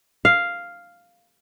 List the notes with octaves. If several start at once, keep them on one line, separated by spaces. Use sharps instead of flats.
F5